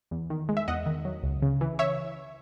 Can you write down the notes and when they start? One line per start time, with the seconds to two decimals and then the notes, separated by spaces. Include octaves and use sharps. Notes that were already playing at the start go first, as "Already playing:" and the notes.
0.11 E2
0.30 D#3
0.49 G#3
0.57 E5
0.68 E2 D#5 F#5
0.86 D#3
1.05 F#3
1.23 C#2
1.42 C#3
1.61 E3
1.79 C#5 E5